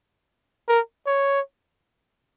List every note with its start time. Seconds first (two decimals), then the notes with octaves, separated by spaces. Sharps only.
0.68 A#4
1.06 C#5